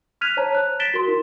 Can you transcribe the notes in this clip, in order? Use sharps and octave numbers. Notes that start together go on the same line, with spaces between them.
F6 F#6 G#6 B6 D#7 F7
C5 C#5 A5 A#5
F#6
A6 B6 D7 E7 G7
F#4 A#4 C6
E4